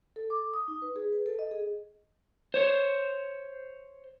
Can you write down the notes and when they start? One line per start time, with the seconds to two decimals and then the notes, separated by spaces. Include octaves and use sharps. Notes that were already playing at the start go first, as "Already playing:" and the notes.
0.16 A4
0.30 D6
0.54 D#6
0.68 D#4
0.82 B4
0.96 G#4
1.12 B4
1.26 A4
1.39 D#5
1.51 G#4
2.54 C5 C#5